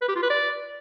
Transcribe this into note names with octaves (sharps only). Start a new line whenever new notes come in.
B4
G4
F4
B4
D5